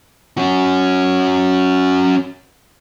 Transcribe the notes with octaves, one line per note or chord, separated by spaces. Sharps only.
C#4 F#4